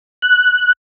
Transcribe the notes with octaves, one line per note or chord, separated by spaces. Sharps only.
F#6